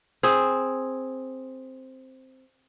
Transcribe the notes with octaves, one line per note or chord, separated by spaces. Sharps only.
C4 G#4